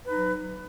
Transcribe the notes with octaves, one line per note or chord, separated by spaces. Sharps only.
F#3 D#4 B4